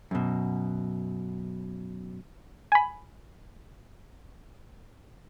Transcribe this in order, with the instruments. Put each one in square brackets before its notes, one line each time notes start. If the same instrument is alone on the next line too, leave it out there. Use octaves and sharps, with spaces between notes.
[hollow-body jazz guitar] F#2 B2
[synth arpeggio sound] G#5 B5